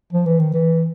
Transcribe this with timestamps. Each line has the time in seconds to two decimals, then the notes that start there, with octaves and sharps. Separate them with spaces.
0.13 F3
0.26 E3
0.40 D#3
0.54 E3